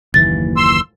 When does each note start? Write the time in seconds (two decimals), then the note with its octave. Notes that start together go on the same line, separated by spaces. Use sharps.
0.14 F#1 D#2 E3 A6
0.57 C6 E6